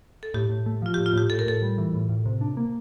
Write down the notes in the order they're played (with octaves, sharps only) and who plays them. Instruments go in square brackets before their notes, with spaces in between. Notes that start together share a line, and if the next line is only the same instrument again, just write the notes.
[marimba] A4
[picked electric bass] A2 [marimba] G4
[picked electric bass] A2
A3
[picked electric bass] F3 [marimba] F4
[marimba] G4
[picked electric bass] A2
[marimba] F4
[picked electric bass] A2 [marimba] G4
[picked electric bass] A2 [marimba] A4
[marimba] A#4
[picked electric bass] A2 [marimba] A4
[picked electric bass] G3
E3
A2
A2
C3
D4
A#3